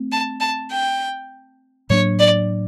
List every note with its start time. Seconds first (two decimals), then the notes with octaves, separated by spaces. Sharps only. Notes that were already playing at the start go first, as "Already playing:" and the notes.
Already playing: A3 C4
0.12 A5
0.40 A5
0.71 G5
1.90 A2 F#3 A#3 D4 C#5
2.19 D5